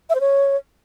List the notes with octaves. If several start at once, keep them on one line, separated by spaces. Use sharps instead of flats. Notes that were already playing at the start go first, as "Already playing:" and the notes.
E5
C5
C#5